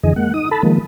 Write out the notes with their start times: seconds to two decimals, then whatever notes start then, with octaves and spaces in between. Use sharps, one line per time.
0.03 F2 D3 E3 G#4 D#5
0.16 G#3 A#3 F#5
0.34 D#4 D#6
0.51 A4 A5 B5
0.63 D#3 F3 G#3 A#3